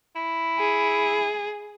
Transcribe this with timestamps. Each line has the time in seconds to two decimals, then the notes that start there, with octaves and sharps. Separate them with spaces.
0.16 E4
0.59 G#4